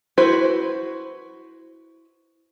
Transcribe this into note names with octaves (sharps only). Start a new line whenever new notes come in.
E4 F#4 B4 C5